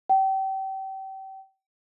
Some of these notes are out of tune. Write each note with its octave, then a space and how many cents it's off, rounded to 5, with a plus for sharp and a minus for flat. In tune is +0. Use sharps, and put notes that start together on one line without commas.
G5 -30